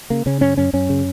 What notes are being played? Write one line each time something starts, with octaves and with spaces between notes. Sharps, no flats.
C#3 A#3
C#3 C#4
F#2 C#4
F#2 C#4
F#2 C#4
C#3